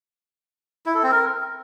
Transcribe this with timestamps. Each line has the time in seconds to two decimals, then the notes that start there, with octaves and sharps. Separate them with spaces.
0.86 E4
0.95 A4
1.03 C4
1.12 A#4